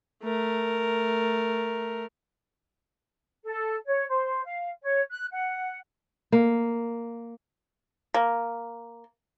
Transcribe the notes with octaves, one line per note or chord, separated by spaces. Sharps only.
A3 A#4
A4
C#5
C5
F5
C#5
F#6
F#5
A#3
A#3